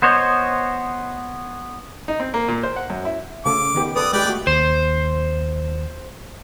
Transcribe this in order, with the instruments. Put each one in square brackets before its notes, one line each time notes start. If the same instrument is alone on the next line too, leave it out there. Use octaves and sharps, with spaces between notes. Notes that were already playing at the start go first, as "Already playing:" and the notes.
[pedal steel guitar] B3 C5 C#5 D#5
[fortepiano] D#4
C4
A#3
A#2
C5
F#5
F#2
E4
[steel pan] C#3 A3 A4 [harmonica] D6
[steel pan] D#3 B3 G4
[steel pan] A4 B4 [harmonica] D5 D#6
[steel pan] G#3 G4 [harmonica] B4 D5 G5
[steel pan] A3 F#4
[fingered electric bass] D#2 [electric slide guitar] C5